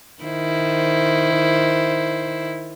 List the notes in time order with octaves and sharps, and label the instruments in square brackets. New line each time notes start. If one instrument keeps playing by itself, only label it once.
[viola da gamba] D#3 E4 C5